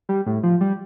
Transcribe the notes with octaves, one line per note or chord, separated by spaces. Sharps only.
G3
A2
F3
G3